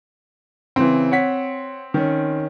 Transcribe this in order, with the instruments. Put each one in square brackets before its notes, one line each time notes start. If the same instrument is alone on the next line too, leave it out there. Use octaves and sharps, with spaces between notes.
[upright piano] C#3 E3 [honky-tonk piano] C4
[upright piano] C#5 F#5 B6
D#3 C#4